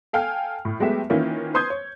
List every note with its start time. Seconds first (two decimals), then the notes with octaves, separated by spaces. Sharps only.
0.13 A4 F5 G5 G#5 F6
0.65 A2
0.80 F#3 G#3 A3 B3 G4 E5
1.10 D#3 E3 A#3 C#4 E4 F4
1.54 B4 C5 C6 D#6 G6 G#6
1.70 C#5